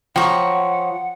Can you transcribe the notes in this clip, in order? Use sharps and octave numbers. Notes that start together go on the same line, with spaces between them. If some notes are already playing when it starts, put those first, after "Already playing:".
F3 C#5 F#5 G5 A#5